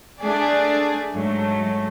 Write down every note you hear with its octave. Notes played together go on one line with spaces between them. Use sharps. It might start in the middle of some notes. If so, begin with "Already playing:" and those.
A3 D4 G#4 D5
G#2 F#3 A3